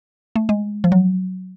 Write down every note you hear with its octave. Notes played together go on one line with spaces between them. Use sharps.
A3
G#3
F3
F#3